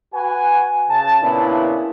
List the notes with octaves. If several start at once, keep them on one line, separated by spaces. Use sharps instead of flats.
F#4 B4 F#5 G#5
C#3 A5
A#2 C#3 A#3 B3 D4 E4